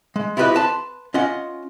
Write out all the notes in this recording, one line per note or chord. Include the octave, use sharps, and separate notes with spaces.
G#3
E4 F4 G4 A4 B4 D#5
B4 A5 B5 C6
C#4 F4 D#5 F#5